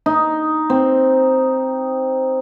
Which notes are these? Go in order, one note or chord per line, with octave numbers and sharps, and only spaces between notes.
D#4
C4